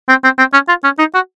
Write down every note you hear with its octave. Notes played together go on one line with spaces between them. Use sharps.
C4
C4
C4
C#4
F4
C#4
D#4
F#4